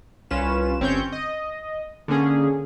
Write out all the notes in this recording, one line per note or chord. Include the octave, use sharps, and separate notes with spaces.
C2 C#4 F4 B4 E7
G1 C4 C#4 C#5 C#6 G6
D#5
D3 A#3 C#4 G#4